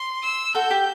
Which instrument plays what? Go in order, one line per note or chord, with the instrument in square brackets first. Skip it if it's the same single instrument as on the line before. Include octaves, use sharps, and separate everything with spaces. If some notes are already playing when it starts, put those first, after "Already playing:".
Already playing: [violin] C6
E6
[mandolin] F#4 A4 [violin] G6
[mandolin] G4